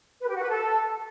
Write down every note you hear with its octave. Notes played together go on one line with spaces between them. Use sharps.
B4
G4
F#4
B4
A4